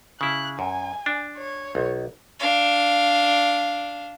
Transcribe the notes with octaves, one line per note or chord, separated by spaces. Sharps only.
C#3 E4 F#6
F#2 G#5
D4
C#5
B1
D4 F5